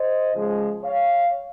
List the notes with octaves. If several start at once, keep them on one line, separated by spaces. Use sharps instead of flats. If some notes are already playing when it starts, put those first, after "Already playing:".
Already playing: C5 D#5
C#3 F3 G#3
C#5 F5